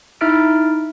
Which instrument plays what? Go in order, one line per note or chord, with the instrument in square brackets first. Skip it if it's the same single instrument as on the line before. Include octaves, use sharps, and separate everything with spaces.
[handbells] D#4 E4 E5 F6 A6 D7